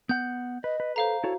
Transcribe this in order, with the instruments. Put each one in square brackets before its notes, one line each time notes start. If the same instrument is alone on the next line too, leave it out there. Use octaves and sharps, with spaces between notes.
[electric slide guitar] B3 F#5 [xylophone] G6
[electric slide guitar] B4 [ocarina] D#5
[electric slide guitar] B4
[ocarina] A4 [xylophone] C5 F5 A#5
[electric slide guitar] E4 A4 C#5 [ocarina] F#4